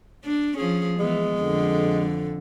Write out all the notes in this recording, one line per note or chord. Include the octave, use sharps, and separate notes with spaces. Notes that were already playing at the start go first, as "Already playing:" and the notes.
D4
F3 C#4 G#4
E3 G#3 B3
F2 D3